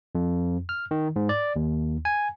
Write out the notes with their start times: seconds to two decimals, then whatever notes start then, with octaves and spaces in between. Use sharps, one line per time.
0.15 F2
0.69 F6
0.91 D#3
1.16 G#2
1.29 D5
1.56 D#2
2.05 G#5